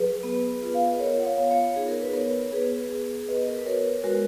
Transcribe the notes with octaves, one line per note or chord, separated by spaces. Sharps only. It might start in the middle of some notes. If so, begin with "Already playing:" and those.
Already playing: F#3 G#4 B4
B3
F4
F5
D#5
F4 A#4 C#5
F#5
C#5 F5
B3
C#5 F5
D#4 G#4
A#4
B4
B3 A#4 C#5
B3 G#4 B4
B3 G#4
B3 B4 D#5
A#4
B4
F#4 A#4 C#5
B4
G#3 F#4 A#4